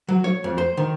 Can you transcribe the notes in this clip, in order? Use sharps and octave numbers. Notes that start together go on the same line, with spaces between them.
F#3
C#5
F2
C5
D#3